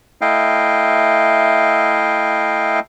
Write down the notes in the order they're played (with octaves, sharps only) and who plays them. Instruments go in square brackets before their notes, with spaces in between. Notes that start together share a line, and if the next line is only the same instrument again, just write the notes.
[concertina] A3 E4 D#5 F5 G5